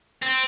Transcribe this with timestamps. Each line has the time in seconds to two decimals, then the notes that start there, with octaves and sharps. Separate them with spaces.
0.22 C4